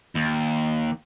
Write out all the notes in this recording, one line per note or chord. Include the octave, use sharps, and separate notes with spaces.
D#2